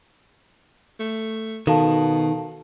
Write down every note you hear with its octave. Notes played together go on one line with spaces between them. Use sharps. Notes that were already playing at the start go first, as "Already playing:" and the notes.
A3
B2 D#3 A4 F5 A5